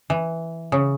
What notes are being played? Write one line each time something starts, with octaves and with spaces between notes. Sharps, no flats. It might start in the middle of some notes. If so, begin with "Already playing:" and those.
E3
C#3